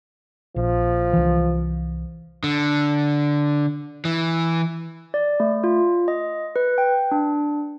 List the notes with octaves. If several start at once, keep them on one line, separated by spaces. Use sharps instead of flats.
A#1 F3
C2 E3
D3
E3
D5
A3
F4
D#5
B4
G5
D4